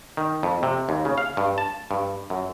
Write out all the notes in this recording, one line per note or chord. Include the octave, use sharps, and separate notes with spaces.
D#3
F2
C3
D#2
C#3
F5
G2
A5
G2
F#2